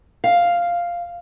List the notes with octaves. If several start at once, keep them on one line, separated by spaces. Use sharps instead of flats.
F5